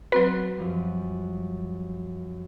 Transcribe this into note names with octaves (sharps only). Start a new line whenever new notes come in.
F#3 C4 F#4 B4
F#2 F3 G3